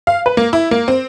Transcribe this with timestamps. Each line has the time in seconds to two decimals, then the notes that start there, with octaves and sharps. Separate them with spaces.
0.07 F5
0.26 B4
0.37 A#3
0.53 E4
0.71 A#3
0.88 C4